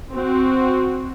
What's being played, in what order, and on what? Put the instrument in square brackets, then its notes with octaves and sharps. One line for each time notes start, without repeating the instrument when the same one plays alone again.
[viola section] C4 F#4